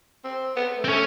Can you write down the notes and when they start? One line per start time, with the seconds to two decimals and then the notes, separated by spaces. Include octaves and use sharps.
0.24 C4
0.56 B3
0.78 A3
0.84 C4
0.89 A3 C#4